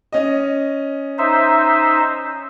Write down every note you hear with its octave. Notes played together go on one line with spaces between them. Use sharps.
C#4 D#5
D#4 C5 E5